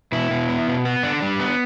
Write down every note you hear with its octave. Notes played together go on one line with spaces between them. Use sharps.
B2 E4
B2
B3
B2
B3
D3 D4
G3
B3